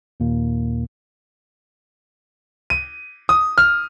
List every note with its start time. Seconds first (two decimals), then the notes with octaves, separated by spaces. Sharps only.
0.20 D#2 A#2 A#3
2.70 D#7
3.29 D#6
3.58 F6